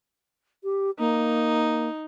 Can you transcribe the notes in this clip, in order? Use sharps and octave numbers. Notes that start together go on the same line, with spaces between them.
G4
A#3 D#4